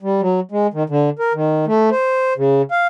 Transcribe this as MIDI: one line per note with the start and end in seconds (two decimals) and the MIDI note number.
0.02 0.21 55
0.21 0.40 54
0.51 0.67 56
0.74 0.83 51
0.90 1.10 50
1.19 1.33 70
1.34 1.65 51
1.67 1.90 57
1.92 2.33 72
2.38 2.62 49
2.71 2.87 77